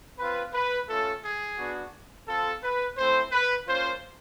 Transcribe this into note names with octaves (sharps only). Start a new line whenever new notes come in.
C4 F4 B4
B4
A3 C#4 F4 A4
G#4
B3 D4 F#4
C4 F4 A4
B4
A3 C4 E4 C5
B4
A#3 C#4 F4 C5